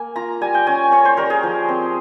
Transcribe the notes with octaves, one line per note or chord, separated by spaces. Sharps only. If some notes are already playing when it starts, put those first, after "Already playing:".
Already playing: A#3 G#5
F4 A#5
G3 G#5
G5
C#4 G#5
C#4 C#5
C5
G3 A#4
G#4
F3
C4